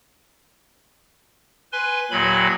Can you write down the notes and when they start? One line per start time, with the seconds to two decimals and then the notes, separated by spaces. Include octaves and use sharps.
1.72 B4 G#5 C6
2.11 D#2 A#2 F#3 B5